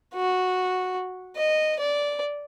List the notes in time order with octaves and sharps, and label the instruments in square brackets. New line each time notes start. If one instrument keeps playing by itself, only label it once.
[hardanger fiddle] F#4
D#5
D5